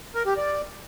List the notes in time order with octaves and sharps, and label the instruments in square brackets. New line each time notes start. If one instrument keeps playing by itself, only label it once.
[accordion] A#4
G4
D5